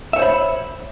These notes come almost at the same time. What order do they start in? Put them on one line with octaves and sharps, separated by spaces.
E5 C#5 C5 B5